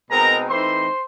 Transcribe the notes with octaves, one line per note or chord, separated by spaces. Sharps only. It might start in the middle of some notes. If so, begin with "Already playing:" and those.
B2 G#3 C4 D#4 A#4 A#5
E3 A3 C4 D#4 C5 C6